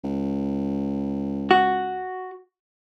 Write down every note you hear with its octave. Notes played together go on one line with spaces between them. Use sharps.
C#2
F#4